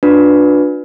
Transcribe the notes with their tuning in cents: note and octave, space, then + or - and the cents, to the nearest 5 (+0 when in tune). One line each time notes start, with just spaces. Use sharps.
D4 +0 F4 +45 B4 +0